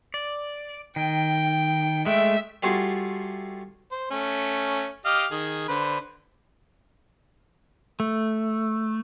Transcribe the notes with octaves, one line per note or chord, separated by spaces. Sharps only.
D5
D#3 G5
G#3 A3 E5 G5
G3 A3 F4 F#4 G#4
C5
A3 C#4
G4 D#5 F5
D#3 G#4
D3 B4 C5
A3